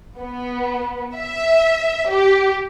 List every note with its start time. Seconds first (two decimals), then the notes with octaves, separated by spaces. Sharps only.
0.19 B3
1.16 E5
2.08 G4